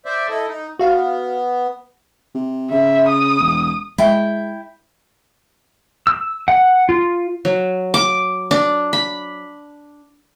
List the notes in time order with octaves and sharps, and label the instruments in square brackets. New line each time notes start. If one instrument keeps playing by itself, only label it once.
[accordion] C5 D5 E5
E4 A4 D#5
D#4
[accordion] B3 [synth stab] F#4 F5
[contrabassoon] C3
[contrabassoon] C#3 [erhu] E5
[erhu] D#6
[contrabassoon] E1
[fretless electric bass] G#3 [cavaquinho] E4 G5
[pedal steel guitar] E6
F#5
F4
[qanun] F#3
D6
D4
B5